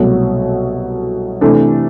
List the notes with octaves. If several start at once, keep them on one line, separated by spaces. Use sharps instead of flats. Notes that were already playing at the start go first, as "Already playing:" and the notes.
Already playing: C2 B2 F#3 A3
C3 E3 A3 D4